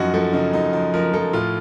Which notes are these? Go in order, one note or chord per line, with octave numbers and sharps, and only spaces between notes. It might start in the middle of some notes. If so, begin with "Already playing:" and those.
Already playing: F#2 F3 D#4 F#4
F3 A4
C#3 D#4
F#2 D#4
F3 D#4
F3 A#4
F3 A4
A2 F4